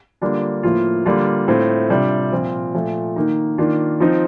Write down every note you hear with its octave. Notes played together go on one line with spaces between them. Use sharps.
D3 G3 A#3 D4 F4
A2 F3 A#3 F4
D3 G3 A#3 D4 F4
A2 A3 C4 F4
C3 G3 D4 F4
A#2 F3 C4 F4
A#2 F3 A3
D#3 A#3 D#4
D#3 A#3 D4 F4
F3 C4 D#4